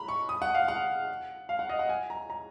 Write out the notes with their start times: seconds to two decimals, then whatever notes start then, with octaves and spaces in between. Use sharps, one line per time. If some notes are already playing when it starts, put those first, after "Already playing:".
Already playing: A#5 B5
0.08 C#6
0.29 D#6
0.42 F#5
0.55 F5
0.68 F#5
1.49 F5
1.59 F#5
1.69 D#5
1.79 F#5
1.89 G#5
2.10 A#5
2.30 A#5